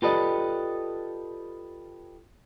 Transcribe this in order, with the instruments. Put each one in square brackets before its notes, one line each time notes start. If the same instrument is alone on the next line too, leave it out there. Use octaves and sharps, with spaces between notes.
[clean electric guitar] F4 G4 A4 B4 D5 D#5